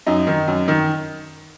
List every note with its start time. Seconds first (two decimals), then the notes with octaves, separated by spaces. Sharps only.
0.06 F#2 D#4
0.27 D#3
0.48 F#2
0.68 D#3